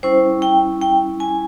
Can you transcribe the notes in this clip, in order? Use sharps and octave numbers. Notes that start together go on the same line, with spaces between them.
G3 C#4 E4 C5
G5
G5
G#5